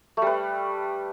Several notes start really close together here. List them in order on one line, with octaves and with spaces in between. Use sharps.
A3 G3 B4